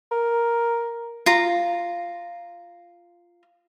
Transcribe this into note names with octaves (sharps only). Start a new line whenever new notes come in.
A#4
F4 A#5